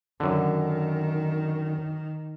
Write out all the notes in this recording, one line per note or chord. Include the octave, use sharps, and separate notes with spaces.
F#2 D3 D#3